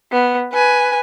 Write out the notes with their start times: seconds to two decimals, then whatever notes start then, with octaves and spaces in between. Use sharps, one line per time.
0.12 B3
0.53 B4 G#5